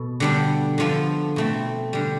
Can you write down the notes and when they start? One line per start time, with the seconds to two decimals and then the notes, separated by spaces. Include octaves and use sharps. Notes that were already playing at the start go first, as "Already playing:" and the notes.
Already playing: B2 A4
0.20 D3 G3 B3 D4
0.78 D3 F3 B3 F4 A4
1.36 B2 A3 C4
1.93 D3 G3